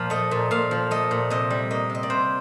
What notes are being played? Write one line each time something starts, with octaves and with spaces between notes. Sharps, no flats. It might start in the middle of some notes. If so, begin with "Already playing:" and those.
Already playing: A#2 F3 F5
A3 D#5
A#2
A#2 F5
F3
A3 D#5
A#2
C3 D#5
G3
A#3 D#5
C3 D#5
D5
C3 C5